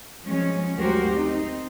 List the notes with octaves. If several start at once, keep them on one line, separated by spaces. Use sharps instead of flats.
F3 F#3 G#3 C#4
D2 F#3 F#4 G4 A#4 C5
C4 D#4